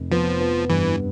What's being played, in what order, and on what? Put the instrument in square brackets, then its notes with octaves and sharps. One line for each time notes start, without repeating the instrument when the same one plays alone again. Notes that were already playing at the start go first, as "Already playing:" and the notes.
Already playing: [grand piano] F1
[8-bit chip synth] F3 [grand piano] B3
[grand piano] B3
[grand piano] G2 [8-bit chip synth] E3